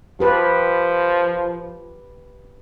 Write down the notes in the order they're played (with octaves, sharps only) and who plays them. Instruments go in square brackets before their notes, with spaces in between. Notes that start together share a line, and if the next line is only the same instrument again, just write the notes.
[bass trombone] F3 [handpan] G4 B4